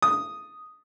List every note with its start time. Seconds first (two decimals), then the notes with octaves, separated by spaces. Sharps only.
0.02 D#6